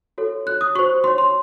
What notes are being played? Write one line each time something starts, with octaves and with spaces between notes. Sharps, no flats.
F#4 A4 C#5
F#4 C#5 F#6
D#6
F#4 C5 C#6
F#4 C#5 C6
C6